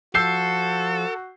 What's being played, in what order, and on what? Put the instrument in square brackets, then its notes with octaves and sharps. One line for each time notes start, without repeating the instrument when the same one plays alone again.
[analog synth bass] F3 [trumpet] F#4 [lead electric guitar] A4 [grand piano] E6 G6 C7